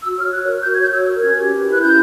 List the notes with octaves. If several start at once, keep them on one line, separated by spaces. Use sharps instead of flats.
F#4 E6
C#5 F6
F#4 F#6
A#4
F#4 G6
G#6
C#5
G6
F#4 E6
A#4
C#4 G#6
G4
B4
E4
F#6
C#4 G6